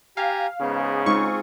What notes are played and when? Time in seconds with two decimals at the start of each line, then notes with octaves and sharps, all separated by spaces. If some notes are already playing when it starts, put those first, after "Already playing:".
0.17 G4 F5 G#5 A#5
0.61 G#2 C#3 B3
1.06 G#3 C4 D#4 F4 G#4 C#6